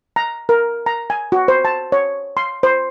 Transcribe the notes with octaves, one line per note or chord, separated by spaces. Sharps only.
A#5
A#4
A#5
G#5
F#4
C5
A5
C#5
C6
C5